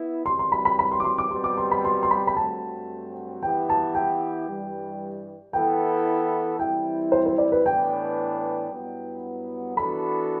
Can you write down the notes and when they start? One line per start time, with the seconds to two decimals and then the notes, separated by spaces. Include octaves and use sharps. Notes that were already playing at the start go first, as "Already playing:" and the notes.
Already playing: B3 E4
0.26 F#2 E3 G3 C4 C6
0.39 C6
0.52 B5
0.65 B5
0.79 B5
0.92 C6
1.00 D6
1.04 C6
1.18 D6
1.31 B2 G3 C4 G4 C6
1.44 D6
1.58 C6
1.71 B5
1.85 C6
2.03 C6
2.11 B5
2.27 B5
2.37 G2 F#3 A3 C4 F#4 A5
3.42 E3 B3 E4 G4 G5
3.70 A5
3.95 G5
4.49 G2 E3 G3
5.53 E3 B3 E4 A4 G5
6.59 E3 G3 C4 E4 G5
7.12 C5
7.26 C5
7.38 D5
7.52 B4
7.65 A2 E3 B3 D4 G5
8.70 G2 F#3 B3 E4
9.77 E3 B3 D4 F#4 A4 B5